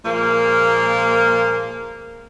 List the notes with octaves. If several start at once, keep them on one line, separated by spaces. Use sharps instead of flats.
A#2 F3 G#3 A#3